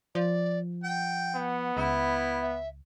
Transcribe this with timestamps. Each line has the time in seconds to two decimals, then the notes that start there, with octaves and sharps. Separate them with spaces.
0.15 F3 D5
0.84 F#5 G5
1.35 B3
1.77 C#2 E4
2.42 E5